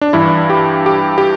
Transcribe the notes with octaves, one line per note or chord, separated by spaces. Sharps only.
D4
G2 E3 E4
G4
G4
G4